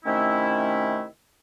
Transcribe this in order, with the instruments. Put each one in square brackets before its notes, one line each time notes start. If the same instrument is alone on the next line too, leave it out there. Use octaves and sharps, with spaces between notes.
[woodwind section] C3 D#3 A3 C#4 E4